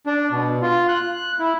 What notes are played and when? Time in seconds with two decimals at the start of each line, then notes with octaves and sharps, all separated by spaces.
0.07 D4
0.31 B2
0.62 F4
0.88 F#6
1.39 E4